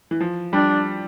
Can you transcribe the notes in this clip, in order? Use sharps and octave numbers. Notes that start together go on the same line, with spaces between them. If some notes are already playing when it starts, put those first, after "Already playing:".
E3
F3
G3 D4